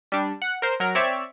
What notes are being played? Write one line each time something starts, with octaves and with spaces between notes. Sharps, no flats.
G3 D4
F#5
A#4 C5
F#3 A#4
C4 C#5 D5 E5